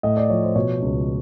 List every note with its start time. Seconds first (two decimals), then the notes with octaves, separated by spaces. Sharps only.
0.03 A2 D#5
0.17 D5
0.30 F3 C#5
0.43 C5
0.56 B2 C#5
0.82 C#2